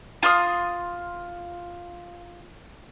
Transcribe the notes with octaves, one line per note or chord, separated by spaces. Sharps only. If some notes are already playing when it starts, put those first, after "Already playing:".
F4 C6 D#6